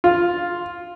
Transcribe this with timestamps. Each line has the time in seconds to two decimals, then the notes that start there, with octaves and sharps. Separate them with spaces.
0.04 F4